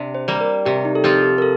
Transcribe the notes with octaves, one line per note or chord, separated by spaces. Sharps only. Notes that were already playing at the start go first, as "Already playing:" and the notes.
Already playing: C3 D4
C5
G3 A#3
A#4
C3 G4
D#4
A4
F3 C4 F4 G4
G4
A#4
A4